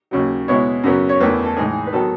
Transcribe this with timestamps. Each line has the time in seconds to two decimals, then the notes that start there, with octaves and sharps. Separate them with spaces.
0.11 D#2 C#3 F#3
0.48 B2 G#3 B3 E4 C#5
0.83 F#2 C#3 F#3 B3
1.09 C#5
1.20 E2 D#3 A3 E4 B4
1.45 A4
1.57 A2 E3 G#3 D#4 G#4
1.87 B4
1.93 D#3 F#3 B3 A4